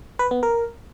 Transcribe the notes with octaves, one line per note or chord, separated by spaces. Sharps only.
B4
B3
A#4